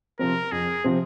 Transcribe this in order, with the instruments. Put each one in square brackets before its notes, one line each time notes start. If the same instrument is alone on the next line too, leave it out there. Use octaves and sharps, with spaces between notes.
[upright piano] C3 F3 C4 [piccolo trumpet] A#4
[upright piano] F2 [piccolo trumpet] G#4
[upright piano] C3 F3 C4